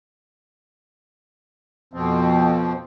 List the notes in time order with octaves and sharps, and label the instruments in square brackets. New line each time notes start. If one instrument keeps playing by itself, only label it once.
[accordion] F2 B2 F3 C4